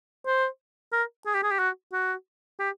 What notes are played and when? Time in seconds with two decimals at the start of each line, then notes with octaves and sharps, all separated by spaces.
0.26 C5
0.93 A#4
1.26 G#4
1.35 G4
1.43 G#4
1.51 G4
1.59 F#4
1.93 F#4
2.60 G4